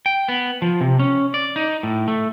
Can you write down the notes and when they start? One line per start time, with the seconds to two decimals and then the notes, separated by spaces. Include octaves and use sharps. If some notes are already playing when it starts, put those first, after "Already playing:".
0.06 G5
0.28 B3
0.62 F3
0.81 C3
0.99 C#4
1.34 D5
1.56 D#4
1.83 A2
2.08 A3